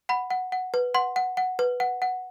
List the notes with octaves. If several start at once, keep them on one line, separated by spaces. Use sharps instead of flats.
F#5 B5
F#5
F#5
B4
F#5 C6
F#5
F#5
B4
F#5
F#5